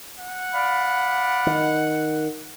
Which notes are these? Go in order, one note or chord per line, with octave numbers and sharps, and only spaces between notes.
F#5
D5 F5 B5
D#3